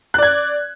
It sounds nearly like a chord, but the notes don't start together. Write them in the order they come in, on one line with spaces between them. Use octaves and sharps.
F#6 D5 G#6